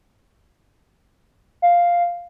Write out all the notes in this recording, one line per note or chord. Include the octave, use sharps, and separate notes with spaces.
F5